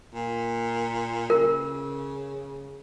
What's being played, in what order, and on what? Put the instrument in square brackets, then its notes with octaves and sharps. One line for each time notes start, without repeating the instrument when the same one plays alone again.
[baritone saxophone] A#2
[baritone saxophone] C#3 [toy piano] A#4